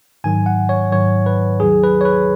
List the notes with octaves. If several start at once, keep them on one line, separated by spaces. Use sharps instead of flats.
G#2 D#3 F#3 G#5
F#5
C#5
G#2 D#3 F#3 C#5
B4
D#2 D#3 F#3 G#4
B4
C#5
B4